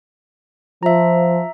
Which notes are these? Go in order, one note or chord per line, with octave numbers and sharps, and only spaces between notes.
F3 E5 A#5